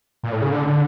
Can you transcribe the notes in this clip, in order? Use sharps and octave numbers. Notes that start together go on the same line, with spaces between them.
A#2
A2
C#3
D3
D3